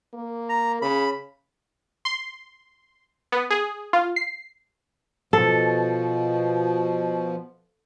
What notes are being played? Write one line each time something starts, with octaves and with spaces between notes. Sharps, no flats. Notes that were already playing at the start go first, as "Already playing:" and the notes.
A#3
A#5
C#3 B5
C6
B3
G#4
F4
C7
B2 F3 A4